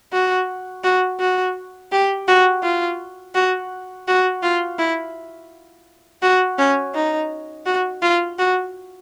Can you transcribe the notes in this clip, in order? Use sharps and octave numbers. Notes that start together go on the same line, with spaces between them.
F#4
F#4
F#4
G4
F#4
F4
F#4
F#4
F4
E4
F#4
C#4
D#4
F#4
F4
F#4